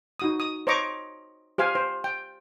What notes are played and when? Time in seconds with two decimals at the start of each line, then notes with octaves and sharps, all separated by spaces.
0.19 D#4 F#4 D#6
0.40 D#6
0.67 C5 C#5 D#5 A#5 C#6 D6
1.58 G4 C5 F5 G#5
1.75 C5
2.04 G5